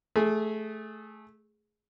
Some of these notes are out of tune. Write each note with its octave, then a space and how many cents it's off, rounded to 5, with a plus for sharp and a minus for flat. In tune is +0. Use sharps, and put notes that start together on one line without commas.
A3 -15 G#4 +0